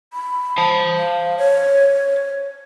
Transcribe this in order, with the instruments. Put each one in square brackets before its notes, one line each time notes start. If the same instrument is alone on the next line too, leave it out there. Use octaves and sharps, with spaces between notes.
[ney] B5
[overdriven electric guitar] C5 A5
[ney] F5
C#5